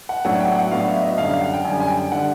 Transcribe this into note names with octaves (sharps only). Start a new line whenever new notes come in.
F#5
A2 F#3 B3 D4 F#5
G5
F#5
A2 F#3 B3 D4 F5
E5
D#5
F#2 D3 G3 F5
F5
F#5
G5
F#2 D3 G3 G#5
G#5
G5
D3 G3 F#5